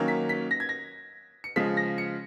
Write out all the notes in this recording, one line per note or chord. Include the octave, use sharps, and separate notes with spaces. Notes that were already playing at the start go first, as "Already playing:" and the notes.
Already playing: D#3 F#3 A#3 C#4
B6
B6
A#6
G#6
A#6
C#7
C#3 F3 G#3 B6
A#6
C#7